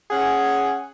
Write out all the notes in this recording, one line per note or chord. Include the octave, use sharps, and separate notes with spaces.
C#4 G#4 F#5